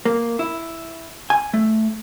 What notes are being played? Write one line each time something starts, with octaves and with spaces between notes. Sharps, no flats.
A#3
E4
G#5
A3